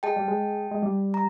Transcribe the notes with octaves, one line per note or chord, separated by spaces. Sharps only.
G#3 G5 A5
G3
G#3
G#3
G3
A#5